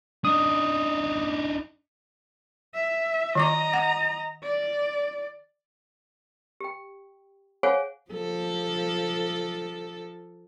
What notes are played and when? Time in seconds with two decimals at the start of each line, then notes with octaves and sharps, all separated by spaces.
0.25 D4 D#4 D#6
2.74 E5
3.35 D#3 D5 D#5 A#5 D6
3.73 F#5
4.43 D5
6.60 G4 G5
7.63 G#4 C5 C#5 F5 F#5 G#5
8.12 F3 A4